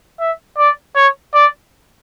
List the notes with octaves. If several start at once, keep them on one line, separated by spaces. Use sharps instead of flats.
E5
D5
C#5
D5